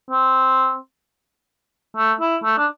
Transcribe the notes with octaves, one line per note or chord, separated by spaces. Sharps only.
C4
A3
E4
A3
D4